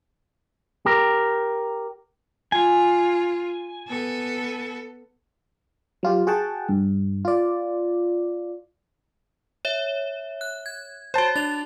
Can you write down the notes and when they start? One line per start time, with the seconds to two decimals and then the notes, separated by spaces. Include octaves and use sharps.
0.86 G4 A#4
2.52 F4 G#5
3.88 B3 A4
6.03 F#3 F4 G4
6.27 F#4 G#4 F#5 G5 A5
6.69 G2
7.25 F4 D5
9.65 C#5 E5
10.41 F#6
10.66 G#6
11.14 F#4 C5 C#5 A5
11.36 D4 A6 F7